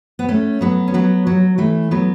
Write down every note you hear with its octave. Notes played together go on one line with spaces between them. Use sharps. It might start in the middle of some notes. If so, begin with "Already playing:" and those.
B3
A3 C#4
F#3 B3
C#4
F#3 B3
F#3
E3 A3
F#3 B3